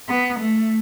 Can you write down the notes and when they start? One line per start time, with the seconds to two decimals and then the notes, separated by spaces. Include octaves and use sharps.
0.09 B3
0.40 A3